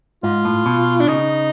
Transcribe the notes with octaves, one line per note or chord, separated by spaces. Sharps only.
G#2 F4
A2
B2
D4
C#3 D#4